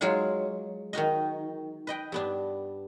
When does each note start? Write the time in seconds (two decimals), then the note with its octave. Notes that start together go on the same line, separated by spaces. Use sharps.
0.01 F#3 G#3 F4 G#4 F#5
0.93 D#3 D#4 F#4 D#5
1.87 B4 D#5 G5
2.12 G2 B3 D4